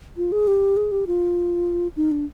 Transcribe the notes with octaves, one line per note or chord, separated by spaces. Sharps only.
F4
G#4
G4
G#4
G4
F4
D#4
D4